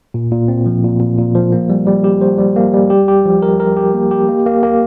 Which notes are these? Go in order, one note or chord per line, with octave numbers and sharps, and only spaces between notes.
A#2
A#2
C4
F3
A#2
A#2
A#2
F3
A#3
G3
G3
G4
C5
G3
A#3
G3
G4
G4
F3
A#4
A#4
G4
A#3
G4
A#3
A#3
A#3